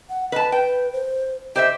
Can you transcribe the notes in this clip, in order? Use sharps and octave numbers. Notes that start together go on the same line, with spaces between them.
F#5
B4 D#5 A5
B4 G5
C5
G4 C5 D#5 E5